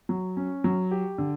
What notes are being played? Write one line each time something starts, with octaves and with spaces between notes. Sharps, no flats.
F#3
C#4
F#3
G4
D3